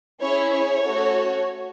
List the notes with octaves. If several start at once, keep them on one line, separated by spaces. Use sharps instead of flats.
C#4 E4 G#4 C#5
C#5
A3 C#4 F#4 A4